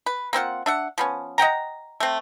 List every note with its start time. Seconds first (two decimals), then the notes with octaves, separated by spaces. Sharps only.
0.06 B4
0.33 A#3 C4 F4 F#5
0.66 D4 E5 F#5
0.98 F3 B3 C#4
1.38 D#5 F#5 G5 A#5
2.00 A3 C4